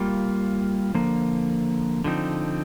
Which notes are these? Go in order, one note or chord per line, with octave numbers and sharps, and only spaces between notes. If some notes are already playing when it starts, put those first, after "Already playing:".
Already playing: G3 A#3 F4
D3 F3 A#3
D3 F3 C4 D#4